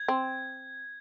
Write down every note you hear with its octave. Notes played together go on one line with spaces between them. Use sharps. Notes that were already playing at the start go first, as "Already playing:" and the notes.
Already playing: G#6
C4